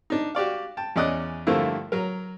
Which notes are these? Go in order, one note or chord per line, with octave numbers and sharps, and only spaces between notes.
D4 D#4
F#4 G4 D5 F5
G5 A5
E2 C#4 D5 D#5 D#6 F#6
G2 D3 F3 A3 A#3 E4
F#3 A#4